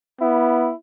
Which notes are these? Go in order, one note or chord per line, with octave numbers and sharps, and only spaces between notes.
B3 E4